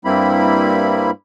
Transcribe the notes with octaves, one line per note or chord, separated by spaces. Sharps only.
G2 G3 A#3 C4 E4 B5